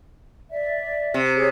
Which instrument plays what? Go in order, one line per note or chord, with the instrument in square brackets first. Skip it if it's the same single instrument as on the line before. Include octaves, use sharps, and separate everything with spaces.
[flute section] D5 E5
[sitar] C3
[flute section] G#4 C#5